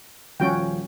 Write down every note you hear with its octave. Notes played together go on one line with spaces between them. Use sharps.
D#1 F3 C#4 F#4 G5